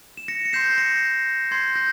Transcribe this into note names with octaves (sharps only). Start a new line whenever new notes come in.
E7
A#6 C#7
C#7
C6 G6 C7 E7
C7
A#6 C#7
C6 G6 G#6 C7
C7
G6 A#6